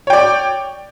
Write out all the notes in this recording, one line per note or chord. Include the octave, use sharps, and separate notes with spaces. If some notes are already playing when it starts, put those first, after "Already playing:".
C#5 D5 G5